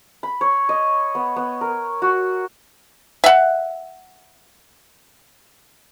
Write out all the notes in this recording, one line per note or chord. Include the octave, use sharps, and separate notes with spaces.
B5
C#5
D#5
B3
B3
A#4
F#4
E5 F#5